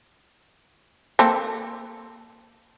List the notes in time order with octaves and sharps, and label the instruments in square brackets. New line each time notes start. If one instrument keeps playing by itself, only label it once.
[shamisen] A#3 C4 A4